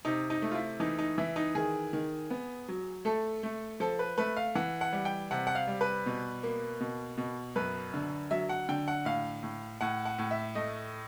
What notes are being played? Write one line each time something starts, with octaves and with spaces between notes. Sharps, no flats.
C3 D#4
D#4
A3
F4
E4
E3 D#4
D#4
E3 E4
D#4
D#3 G#4
D#3
B3
F#3
A3 A4
A3
F3 A4
B4
A3 B4
F5
E3 F#5
F#5
G3
G5
C3 F#5
F#5
F5
G3
B4
B2
A#3
B2
B2
F#2 B4
D3
F#3 E5
F#5
D3 G5
F#5
A2 F5
A2
A2 F#5
F#5
A2
E5
A3 D#5